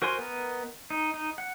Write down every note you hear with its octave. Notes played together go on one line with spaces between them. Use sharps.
F#4 A#4 C5 G#5 C6
B3 A#4 D#5
D#4
D#4
F#5